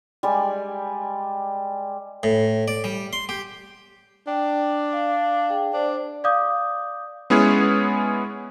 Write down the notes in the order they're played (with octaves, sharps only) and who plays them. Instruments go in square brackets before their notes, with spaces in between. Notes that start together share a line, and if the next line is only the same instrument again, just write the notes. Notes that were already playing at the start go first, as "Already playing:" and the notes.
[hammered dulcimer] G3 G#3 D5 G#5
[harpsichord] A2
D5
G3
C6
G4
[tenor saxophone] D4 [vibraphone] G5
[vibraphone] F5
G#4 G5
[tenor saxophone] D4 [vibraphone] C5 D5
[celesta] D5 F5 D6 D#6 G6
[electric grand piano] G#3 B3 C#4 E4 G#4 C#5